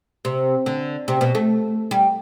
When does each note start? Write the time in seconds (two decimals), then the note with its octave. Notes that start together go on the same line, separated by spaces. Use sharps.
0.25 C3
0.66 D3
1.08 C3
1.21 B2
1.35 A3
1.91 G3